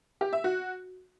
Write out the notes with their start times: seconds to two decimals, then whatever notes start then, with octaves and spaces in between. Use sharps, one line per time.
0.21 G4
0.33 E5
0.44 F#4